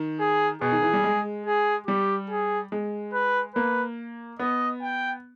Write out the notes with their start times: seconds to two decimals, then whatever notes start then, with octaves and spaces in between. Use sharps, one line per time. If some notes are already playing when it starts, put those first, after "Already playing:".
Already playing: D#3
0.20 G#4
0.61 B2 G#4
0.72 D#3
0.82 E3
0.93 G3
1.04 G#3
1.46 G#4
1.87 G3 G4
2.30 G#4
2.72 G#3
3.13 B4
3.55 A#3 B4
4.39 B3 D#5
4.82 G5